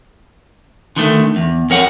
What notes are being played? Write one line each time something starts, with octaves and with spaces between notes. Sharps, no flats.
D3 D#3 A3
E2
F2 A#4 C#5 F#5